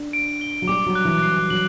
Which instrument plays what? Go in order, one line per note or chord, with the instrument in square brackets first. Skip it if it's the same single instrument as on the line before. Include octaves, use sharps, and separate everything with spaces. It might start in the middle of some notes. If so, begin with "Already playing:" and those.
Already playing: [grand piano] D4
[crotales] D7
G7
[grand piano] F#3
[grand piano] G3 [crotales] D6
[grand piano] F#3
[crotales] F#6
[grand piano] E3
[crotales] C7
[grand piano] F#3 [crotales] F#7